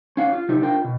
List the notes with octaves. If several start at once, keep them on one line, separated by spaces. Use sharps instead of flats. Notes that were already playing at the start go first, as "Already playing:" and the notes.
C#4 F5 F#5
F4
C3 F#3 D#4 E4 G4
D4 F4 A#4 G5
B2